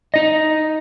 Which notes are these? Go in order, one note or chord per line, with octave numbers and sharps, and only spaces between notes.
D#4 D#5